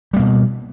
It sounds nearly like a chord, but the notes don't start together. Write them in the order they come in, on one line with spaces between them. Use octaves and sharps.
G3 A#3 B2